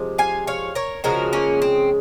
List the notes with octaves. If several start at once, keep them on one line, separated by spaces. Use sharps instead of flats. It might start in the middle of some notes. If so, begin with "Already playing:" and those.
Already playing: C3 F3 G#3
F5 G#5
C#5 F5
A#4 C#5
C#3 F3 G#3 F#4 A#4
A#3 C#4
C4